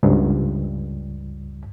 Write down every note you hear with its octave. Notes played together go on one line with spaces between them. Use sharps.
C#2 G2